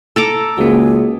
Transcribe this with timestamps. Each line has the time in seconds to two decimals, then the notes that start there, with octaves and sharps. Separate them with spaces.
0.16 A4 A#5 D6
0.58 C#2 A#3 F#4 G#4